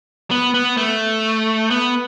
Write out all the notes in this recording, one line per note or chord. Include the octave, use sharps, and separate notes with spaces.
B3
B3
A3
B3